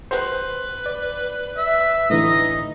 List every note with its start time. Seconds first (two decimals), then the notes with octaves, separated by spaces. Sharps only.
0.11 B4 C5
0.86 D5
1.57 E5
2.10 A2 D3 E3 D#4 D#5